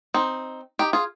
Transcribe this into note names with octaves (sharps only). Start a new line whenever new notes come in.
C4 D#4
D#4 G4
F4 G#4